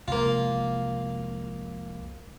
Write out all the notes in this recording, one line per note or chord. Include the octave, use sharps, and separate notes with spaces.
F1 C2 G#3 A#3 F4